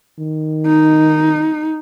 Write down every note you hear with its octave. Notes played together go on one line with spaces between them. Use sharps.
D#3
D#4